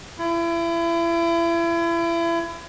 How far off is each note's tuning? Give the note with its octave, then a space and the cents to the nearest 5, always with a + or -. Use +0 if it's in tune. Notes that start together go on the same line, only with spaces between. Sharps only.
E4 +35